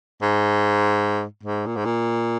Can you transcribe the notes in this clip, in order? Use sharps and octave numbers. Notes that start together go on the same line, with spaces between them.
G#2
G#2
A#2
G#2
A#2